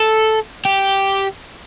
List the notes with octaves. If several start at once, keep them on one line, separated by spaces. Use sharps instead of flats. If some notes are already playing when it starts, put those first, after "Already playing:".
Already playing: A4
G4